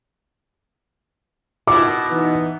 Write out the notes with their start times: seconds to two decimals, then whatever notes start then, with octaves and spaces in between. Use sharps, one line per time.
1.67 B2 E4 D6
2.10 E3 B3 D#4